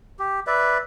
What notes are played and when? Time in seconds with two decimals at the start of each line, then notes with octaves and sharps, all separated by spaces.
0.19 G4
0.47 B4 D5 E5